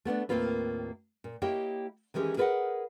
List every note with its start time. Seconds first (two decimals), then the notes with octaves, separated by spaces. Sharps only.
0.05 A3 B3 C#4 D4
0.29 D#2 A2 A#3 C4 F4 B4
1.24 A#2
1.42 A#3 E4 G4 C#5 D#5 G5
2.14 D#3 E3 G#3 C#4 G4
2.37 G#4 A#4 B4 D5 D#5 F#5